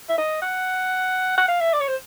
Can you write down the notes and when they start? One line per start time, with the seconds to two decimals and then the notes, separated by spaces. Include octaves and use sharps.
0.09 E5
0.18 D#5
0.42 F#5
1.38 F#5
1.48 F5
1.60 E5
1.73 D5
1.81 C#5
1.88 C5